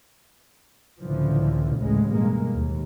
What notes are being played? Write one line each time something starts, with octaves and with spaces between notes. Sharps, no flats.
C#2 A2 D3 E3 F3
A1 D2 A2 C#3 G#3
G2 B2 G#3 A#3
D#2